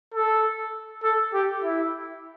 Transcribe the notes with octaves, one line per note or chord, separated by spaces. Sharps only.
A4
A4
G4
E4